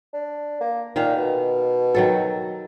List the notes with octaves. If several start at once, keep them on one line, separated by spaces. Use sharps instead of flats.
D4
A#3
A#2 D#3 E5 F5
B2
D#3 F#3 A4